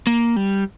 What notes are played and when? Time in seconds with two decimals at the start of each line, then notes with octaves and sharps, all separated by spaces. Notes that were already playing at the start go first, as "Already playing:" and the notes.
0.07 A#3
0.36 G3